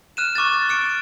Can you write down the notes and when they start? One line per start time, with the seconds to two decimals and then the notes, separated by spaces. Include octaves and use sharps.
0.17 F6 F#6 D#7 E7
0.35 C#6 D6 F6 A6
0.53 A6
0.69 D6 F6 C#7 D7